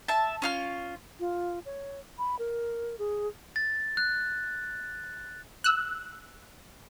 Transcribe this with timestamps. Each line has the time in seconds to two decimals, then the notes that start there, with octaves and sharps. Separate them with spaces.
0.08 E5 A5
0.42 C#4 F4 F6
1.20 F4
1.65 C#5
2.18 B5
2.39 A#4
2.99 G#4
3.56 A6
3.97 F#6
5.64 E6 F#6